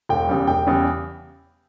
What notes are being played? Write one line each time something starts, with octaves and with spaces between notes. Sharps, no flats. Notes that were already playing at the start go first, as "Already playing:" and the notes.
E1 G5
E2 C#3 G3
E1 G5
E2 C#3 G3